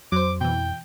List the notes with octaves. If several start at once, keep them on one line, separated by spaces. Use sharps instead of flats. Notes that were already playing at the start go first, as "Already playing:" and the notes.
F2 F#3 C5 D6
B2 E3 G5